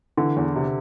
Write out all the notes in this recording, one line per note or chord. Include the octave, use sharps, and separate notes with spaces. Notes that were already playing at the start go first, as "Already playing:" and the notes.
D3 E3
E2
C3